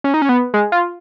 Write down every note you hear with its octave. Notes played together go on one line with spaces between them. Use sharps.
C#4
D#4
C#4
B3
G#3
F4